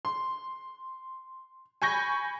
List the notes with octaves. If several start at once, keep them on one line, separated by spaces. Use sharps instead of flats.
C6
G#5 B5 C#6 G6 A#6